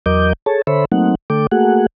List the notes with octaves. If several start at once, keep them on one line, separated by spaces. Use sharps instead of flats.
E2 F#3 A#4 D#5 D6 G6
G#4 A4 C#5 A5
D3 A4 C5 C#5 E5 B5
F#3 A3 A#3 C4 D#4 F#5
D3 A3 A4 G5 D6
A3 A#3 F#4 G#4 F#5